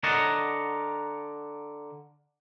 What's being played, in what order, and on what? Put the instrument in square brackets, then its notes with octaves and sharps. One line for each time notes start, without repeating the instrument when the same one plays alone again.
[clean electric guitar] D3 A#4 C#5 D#5 F#5 A5